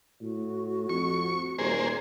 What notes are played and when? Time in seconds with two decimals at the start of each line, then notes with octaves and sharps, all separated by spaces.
0.21 A2 F#4
0.89 F2 C#6
1.59 D#1 A#3 G#4 C5